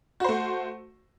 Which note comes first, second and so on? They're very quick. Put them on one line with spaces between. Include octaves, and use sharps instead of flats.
F#4 C5 A3